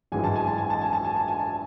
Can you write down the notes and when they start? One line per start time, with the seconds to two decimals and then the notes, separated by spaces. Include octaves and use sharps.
0.12 G#1 F#2 E3 G#3 G#5
0.24 A5
0.36 G#5
0.47 A5
0.58 G#5
0.70 A5
0.82 G#5
0.93 A5
1.05 G#5
1.16 A5
1.28 G#5
1.39 A5